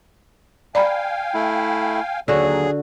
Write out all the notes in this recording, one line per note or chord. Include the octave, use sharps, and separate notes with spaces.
D5 F5 G5 G#5 A#5 B5
A3 E4
D#2 D3 F#3 F#4 G#4